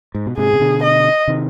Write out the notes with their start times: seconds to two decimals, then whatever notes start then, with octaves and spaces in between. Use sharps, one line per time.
0.15 G#2
0.27 B2
0.38 G#2 C3 G#4
0.53 C3
0.60 B2 D3
0.83 D#5
1.28 C3 D#3